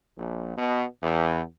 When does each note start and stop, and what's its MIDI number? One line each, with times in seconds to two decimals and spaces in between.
0.17 0.56 34
0.56 0.84 47
1.02 1.41 40